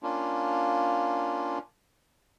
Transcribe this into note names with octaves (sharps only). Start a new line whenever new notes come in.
A#3 C#4 D4 F4